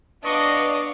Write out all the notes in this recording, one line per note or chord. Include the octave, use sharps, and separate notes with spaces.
B3 D4 D5 D#5 F5 C#6